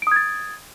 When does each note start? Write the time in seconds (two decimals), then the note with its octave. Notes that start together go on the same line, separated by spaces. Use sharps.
0.02 D7
0.07 D#6
0.12 G#6
0.16 A6